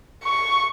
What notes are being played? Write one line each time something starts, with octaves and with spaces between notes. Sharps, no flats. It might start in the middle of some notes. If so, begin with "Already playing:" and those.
C#6